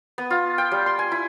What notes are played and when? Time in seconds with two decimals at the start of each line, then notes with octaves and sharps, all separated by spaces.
0.18 B3
0.30 F4
0.58 G5
0.71 G3
0.86 C6
0.99 G#5
1.11 E4